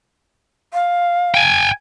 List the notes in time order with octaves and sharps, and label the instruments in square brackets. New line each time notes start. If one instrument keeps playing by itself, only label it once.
[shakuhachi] F5
[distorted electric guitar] G5 G#5